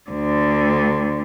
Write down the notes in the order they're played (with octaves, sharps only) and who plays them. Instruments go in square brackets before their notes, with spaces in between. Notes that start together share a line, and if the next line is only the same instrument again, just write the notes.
[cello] D2 D3